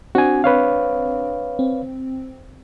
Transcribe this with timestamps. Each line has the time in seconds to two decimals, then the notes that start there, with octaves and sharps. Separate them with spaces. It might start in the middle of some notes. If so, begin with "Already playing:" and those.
0.15 C4 D4 F#4 G#5
0.44 B4 C#5 F5
1.59 C4